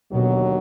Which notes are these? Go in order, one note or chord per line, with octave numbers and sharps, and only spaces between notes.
D#2 B2 D3 F#3